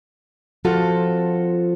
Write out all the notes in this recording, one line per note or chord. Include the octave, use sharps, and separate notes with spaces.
F3 C4 F4 F#4 A4